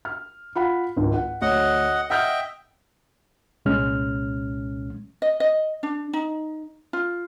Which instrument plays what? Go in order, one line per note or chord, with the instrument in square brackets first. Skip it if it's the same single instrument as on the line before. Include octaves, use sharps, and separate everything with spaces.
[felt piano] F6
F4 F#5 B5
G#1 C#2 G#2
F#5
[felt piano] D2 C#5 [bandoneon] D#5 F#5
[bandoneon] D#5 E5 G5 [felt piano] F#5 F6 G6
[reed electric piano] C2 A#2 G#3 C#4 F6
[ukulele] D#5
D#5
D4
D#4
F4